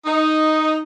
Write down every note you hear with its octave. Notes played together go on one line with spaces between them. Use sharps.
D#4